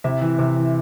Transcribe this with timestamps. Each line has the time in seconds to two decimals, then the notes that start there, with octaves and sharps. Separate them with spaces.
0.04 C3 E4 E5
0.21 E3
0.39 C3
0.57 E3